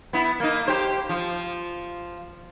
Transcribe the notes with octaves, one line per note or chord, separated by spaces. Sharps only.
B3 E4
A#3 D#4
G4 C5
F3